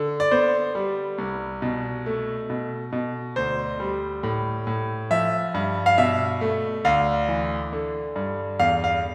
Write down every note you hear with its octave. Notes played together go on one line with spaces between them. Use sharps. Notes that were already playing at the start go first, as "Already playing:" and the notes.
Already playing: D3
D5
B3 C5
G3
C2
B2
A3
B2
B2
D2 C5
G3
A2
A2
F3 E5
G2
F5
B2 E5
A3
D2 F5
E3
D3
G2
E2 F5
F5